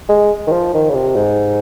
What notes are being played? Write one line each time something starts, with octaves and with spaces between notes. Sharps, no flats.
G#3
D#3
F3
D#3
C#3
C3
G#2